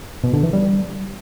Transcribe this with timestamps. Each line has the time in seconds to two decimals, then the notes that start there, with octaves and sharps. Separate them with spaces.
0.24 B2
0.33 D3
0.43 E3
0.53 G3